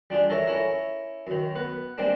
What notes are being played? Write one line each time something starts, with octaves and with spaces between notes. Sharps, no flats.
G3 D4 F4 G#4
A4 A#4 C#5 E5 A#5
C#4 E4 A#4
F#2 D#3
B3 B4
G3 G#3 A#3 C4 D4